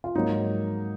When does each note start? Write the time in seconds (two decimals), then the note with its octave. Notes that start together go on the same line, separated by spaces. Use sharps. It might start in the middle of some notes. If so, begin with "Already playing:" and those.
0.04 F4
0.15 G#2 F#3 A#3 D#4